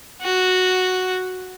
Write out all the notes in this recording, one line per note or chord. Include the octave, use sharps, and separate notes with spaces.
F#4